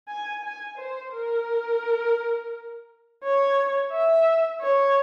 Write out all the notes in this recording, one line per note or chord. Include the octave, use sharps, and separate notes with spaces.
G#5
G#5
C5
A#4
C#5
E5
C#5